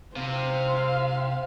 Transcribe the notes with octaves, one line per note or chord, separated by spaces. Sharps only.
C3 C5 F5